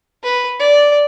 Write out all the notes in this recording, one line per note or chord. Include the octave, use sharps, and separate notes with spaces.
B4
D5